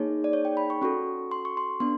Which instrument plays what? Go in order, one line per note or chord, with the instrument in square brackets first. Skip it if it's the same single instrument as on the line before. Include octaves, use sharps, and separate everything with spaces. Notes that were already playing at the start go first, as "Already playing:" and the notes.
Already playing: [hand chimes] A#3 D#4 G#4 C#5
D5
C#5
G5
B5
C#6
C#4 F#4 A4 C#6
C6
C#6
C6
B3 D4 C6